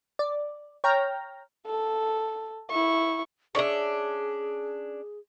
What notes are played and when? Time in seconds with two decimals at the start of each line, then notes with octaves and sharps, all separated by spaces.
0.19 D5
0.84 C#5 G5 A#5 F6 A#6
1.66 A4
2.71 E4 C#6
3.55 C#4 D4 G#4 C#5 D5 E5